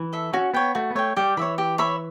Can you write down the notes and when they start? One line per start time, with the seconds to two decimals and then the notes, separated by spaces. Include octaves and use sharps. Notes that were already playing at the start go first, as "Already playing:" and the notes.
Already playing: E3
0.13 A4 E5
0.33 C#4 F#4
0.54 B3 C#5 G5
0.75 A3 F#4
0.90 B3
0.95 A3 C#5 G5
1.17 G3 G4
1.37 E3 C#5 E5 B5
1.58 G4
1.78 C#5 E5 B5